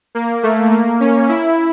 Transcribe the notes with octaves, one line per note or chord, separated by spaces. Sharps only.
A#3
A3
A#3
C#4
E4